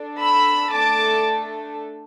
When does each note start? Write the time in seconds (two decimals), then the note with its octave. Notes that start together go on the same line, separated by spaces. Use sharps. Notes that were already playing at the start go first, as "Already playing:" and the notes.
Already playing: D4 A4
0.20 B5 E6
0.72 A3 D4 A4 A5 D6